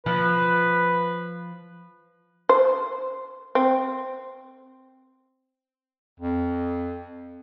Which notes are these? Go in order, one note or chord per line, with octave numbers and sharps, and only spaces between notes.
F3 B4
C5
C4
F2